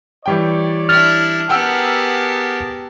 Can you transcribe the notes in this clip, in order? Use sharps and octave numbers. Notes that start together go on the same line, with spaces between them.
E3 G3 C#5 D5 G5
D4 E4 F6 A6
B3 G4 G#4 A#4 F#5 G5 A5 E6